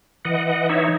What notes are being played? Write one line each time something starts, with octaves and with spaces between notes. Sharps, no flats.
E3 D#5 F#5
D#5 F#5
D#4 C#5 E5